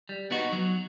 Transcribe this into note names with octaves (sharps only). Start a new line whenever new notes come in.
G3
B3 D#4 F#4
F#3